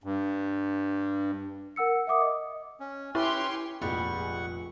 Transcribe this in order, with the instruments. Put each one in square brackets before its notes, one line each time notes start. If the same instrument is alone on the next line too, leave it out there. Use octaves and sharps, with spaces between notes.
[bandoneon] G2
[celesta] A#4 F#5 E6 C#7
E5 F#5 D6 D#6
D#5
[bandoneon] C#4
[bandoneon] C#4 G4 B4 [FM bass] E4 [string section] C#5 G5 C6
[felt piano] F1 A#1 [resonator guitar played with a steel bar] G3 G#3 [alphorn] G#4 [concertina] F#5 C#6